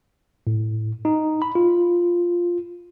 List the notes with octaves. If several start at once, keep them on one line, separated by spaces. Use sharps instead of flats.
A2
D#4
B5
F4